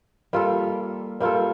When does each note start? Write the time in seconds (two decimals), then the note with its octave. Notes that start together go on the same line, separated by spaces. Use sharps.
0.33 G3 A#3 F4 A4
1.20 G3 A#3 F4 A4